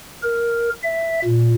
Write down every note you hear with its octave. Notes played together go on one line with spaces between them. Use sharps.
A#4
E5
A#2